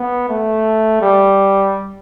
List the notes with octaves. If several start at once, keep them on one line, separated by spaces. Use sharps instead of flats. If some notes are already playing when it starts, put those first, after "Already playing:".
Already playing: B3
A3
G3